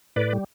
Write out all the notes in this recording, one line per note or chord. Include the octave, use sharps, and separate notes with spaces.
A2 B4 D5
G3